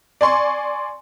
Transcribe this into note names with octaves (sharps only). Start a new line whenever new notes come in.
D5 G#5 C6 C#6